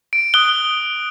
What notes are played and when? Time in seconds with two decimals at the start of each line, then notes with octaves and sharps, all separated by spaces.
0.13 D7
0.34 D#6 F#6 G7